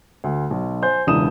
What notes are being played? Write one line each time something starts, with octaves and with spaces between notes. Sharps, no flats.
D2
B1
C5 G#5 G6
E1 C#2 D4 E4 D#6 E7